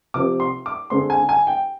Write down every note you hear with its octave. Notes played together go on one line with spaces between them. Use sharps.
C3 F3 C4 D6
C6
D6
D3 G#3 C4 C6
G#5
G#5
G5